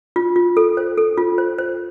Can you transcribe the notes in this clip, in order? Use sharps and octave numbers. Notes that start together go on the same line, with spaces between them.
F4
F4
A4
C5
A4
F4
C5
C5